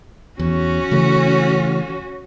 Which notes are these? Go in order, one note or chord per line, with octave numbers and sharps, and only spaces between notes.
E2 C#4 F#4
C#3 E3 A3